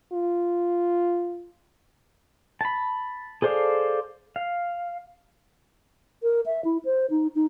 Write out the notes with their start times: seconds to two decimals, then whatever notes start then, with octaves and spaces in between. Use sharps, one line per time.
0.12 F4
2.61 A5 B5
3.42 G#4 A4 C5 D5 F5
4.36 F5
6.23 A#4
6.46 E5
6.65 E4
6.85 C5
7.10 D#4
7.35 D#4